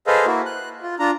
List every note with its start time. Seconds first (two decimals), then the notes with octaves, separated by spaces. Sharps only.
0.07 G#4 A4 B4 C5 D#5 F5
0.26 A#3 E4 F#4
0.46 F#6
0.83 F4
0.99 D4 F4 A#5